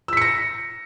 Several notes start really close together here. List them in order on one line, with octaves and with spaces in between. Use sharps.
E6 B6 C#7 A#6